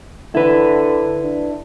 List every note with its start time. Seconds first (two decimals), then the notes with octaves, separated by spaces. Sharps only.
0.35 D3 E4 B4
1.23 D4